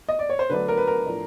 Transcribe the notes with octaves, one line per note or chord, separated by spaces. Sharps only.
D#5
D5
C#5
C5
D3 F#3 A3 D4 B4
A#4
B4
A#4
A2 F3 A3 D4